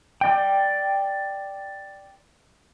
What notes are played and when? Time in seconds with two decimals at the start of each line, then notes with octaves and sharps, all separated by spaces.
0.21 D5 G5